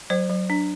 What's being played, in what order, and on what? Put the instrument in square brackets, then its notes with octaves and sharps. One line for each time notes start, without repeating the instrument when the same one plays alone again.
[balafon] F#3 C5
F#3
D4